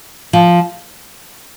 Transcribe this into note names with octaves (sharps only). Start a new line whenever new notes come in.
F3